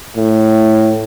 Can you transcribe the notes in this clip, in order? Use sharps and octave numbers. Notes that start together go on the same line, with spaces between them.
A2